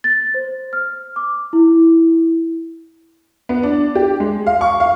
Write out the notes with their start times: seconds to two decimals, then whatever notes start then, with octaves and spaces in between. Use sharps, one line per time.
0.04 A6
0.34 C5
0.73 F6
1.16 D6
1.53 E4
3.49 B3
3.63 D4
3.95 G4
4.20 G#3
4.47 F5
4.61 C#6
4.80 F5